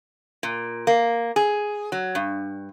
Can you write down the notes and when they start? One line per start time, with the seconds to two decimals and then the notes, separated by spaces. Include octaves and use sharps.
0.43 A#2
0.87 A#3
1.36 G#4
1.92 F#3
2.15 G2